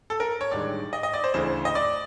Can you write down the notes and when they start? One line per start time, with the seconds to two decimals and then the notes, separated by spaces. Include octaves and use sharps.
0.10 A4
0.20 A#4
0.41 C#5
0.51 A1 G2 D#3 G#3 D5
0.93 D#5
1.03 D#5
1.14 D5
1.24 C5
1.34 D2 C#3 E3 A3 C5
1.65 D#5
1.75 D5